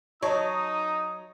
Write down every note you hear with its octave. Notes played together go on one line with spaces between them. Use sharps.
F#3 D#4 C#5 D#5 A5 D#6